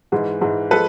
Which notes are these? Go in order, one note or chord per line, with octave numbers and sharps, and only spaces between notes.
G#2 E3 G#3
G#2 E3 G#3
F3 G#3 A4 B4